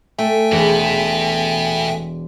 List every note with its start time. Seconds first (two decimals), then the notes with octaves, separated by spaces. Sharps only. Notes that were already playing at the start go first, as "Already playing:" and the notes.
0.19 A3 A4 E5 G5 G#5
0.52 E1 B2 B3